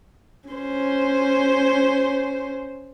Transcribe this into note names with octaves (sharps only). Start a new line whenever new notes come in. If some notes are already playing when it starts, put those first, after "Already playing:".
C#4 C5